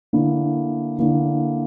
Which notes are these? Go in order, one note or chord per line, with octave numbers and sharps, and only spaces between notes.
D3 A#3 E4
D3 A#3 E4